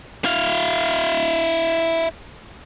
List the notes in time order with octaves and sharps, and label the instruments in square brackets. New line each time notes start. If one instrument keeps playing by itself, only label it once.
[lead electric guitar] E4 F5